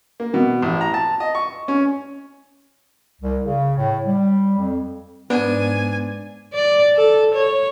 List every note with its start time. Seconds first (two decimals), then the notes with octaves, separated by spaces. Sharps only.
0.20 A#3
0.34 B2
0.62 A1
0.81 A#5
0.94 A5
1.20 D#5
1.35 C#6
1.68 C#4
3.21 C2
3.44 C#3
3.78 A2
4.06 G3
4.58 F2
5.30 G#2 B3 D4 G#5
6.53 D5
6.96 A4
7.35 C#5